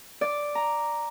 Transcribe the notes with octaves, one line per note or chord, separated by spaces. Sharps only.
D5
A#5